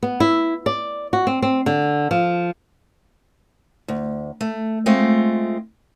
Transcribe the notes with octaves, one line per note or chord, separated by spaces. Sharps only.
B3
E4
D5
F#4
C4
C4
D3
F3
D2
A3
G#3 A3 C4 F4